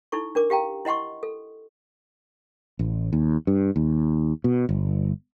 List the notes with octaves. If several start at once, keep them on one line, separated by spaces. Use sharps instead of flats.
D#4 E4 A4 C#6
D4 A#4 D6
G4 F5 G5 A#5
E4 D#5 F#5 C6 C#6
A4
A1
D#2
G2
D#2
B2
G1